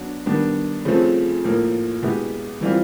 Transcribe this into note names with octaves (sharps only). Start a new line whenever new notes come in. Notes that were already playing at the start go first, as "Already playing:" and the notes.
Already playing: F#3 B3 D4 F#4
D#3 G3 B3 D4
C#3 F3 A3 C4
A2 F3 A#3
B2 G#3 B3 E4 G4
E3 G3 C4 F4